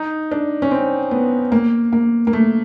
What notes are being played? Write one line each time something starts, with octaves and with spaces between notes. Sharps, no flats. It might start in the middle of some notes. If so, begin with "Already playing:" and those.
Already playing: D#4
D4
C#4
C4
B3
A#3
A#3
A#3
A3